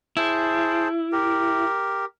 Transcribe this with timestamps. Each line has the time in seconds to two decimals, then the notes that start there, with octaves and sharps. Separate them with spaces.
0.17 E4 G#4 C5 A5
1.12 G4 A#4